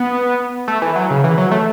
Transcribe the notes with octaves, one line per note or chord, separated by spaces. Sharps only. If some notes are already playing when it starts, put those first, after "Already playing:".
Already playing: B3
A3
E3
F#3
C#3
E3
F#3
A3